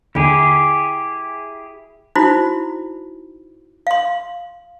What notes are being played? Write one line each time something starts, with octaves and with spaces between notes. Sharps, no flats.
D#2 D3 E4 G4 G#4
D#4 E4 F#4 C5 B5
F5 C6